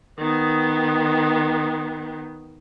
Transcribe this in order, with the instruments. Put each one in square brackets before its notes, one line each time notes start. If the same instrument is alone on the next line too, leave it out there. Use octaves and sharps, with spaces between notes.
[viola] D#3 B3